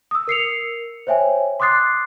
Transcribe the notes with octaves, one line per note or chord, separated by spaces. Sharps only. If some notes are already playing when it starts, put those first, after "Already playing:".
D#6 E6
A#4 C7 C#7 F7
C5 C#5 E5 G5 G#5
C6 D6 D#6 F#6 A6 C7